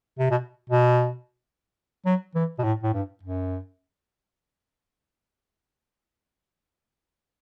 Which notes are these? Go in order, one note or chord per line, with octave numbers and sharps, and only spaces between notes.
C3
B2
B2
F#3
E3
B2
A2
A2
G2
F#2